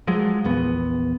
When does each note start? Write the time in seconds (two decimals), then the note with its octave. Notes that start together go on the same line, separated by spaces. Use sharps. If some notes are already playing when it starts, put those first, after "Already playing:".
0.07 F3 F#3 G#3
0.44 A#1 E2 B3